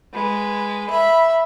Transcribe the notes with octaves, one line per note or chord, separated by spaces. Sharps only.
G#3 B4
E5 B5